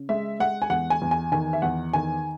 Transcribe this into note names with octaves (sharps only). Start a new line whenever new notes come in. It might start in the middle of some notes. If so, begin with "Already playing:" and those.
Already playing: C#3
G#3 E5
G#3 F#5
G#5
E2 F#5
G#5
E2
G#5
D#3 G#5
E5
E2 F#5
D#3 G#5